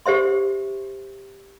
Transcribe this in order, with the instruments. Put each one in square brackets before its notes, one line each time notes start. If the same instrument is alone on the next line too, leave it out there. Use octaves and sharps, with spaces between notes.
[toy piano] G4 C5 E5 C6